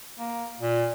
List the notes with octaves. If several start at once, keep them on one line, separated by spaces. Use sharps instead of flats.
A#3
A#2